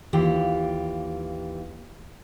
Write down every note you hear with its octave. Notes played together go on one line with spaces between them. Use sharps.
D#2 E3 F4 G4